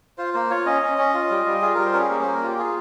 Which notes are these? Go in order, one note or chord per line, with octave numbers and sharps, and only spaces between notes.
F4 C5
A#3 C5
F4 C#5
C#4 D#5
C#4
C#4
F4
G3
G3
F4 G#4
G3 A#4
C5
C#4 G#4 A#4
A#3 G#4
A#3 C5
A#4
F4 G4
F4 G#4